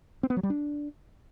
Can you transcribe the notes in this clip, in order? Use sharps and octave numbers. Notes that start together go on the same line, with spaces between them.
C4
B3
F#3
G3
D4